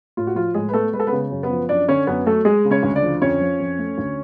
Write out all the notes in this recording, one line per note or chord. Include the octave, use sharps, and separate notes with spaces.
A2 F4
F#4
F3 F4
A2 G#3 G#4
B4
A3 B3 A4
G#3 B4
A4
B3 B4
C#3
F#2
B3 B4
F3
F#2 D4 D5
D3 C#4 C#5
F#2 B3 B4
F#3 A3 A4
G#3 G#4
C#3
C#4 C#5
D2
D4 D5
F3
F2 C#4 C#5
F3
F2
A3
D2